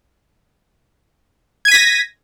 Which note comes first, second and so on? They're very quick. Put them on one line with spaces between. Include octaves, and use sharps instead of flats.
G#6 D#7 B6 A#6